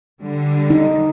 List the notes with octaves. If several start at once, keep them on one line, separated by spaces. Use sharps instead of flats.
D3 G3
D#4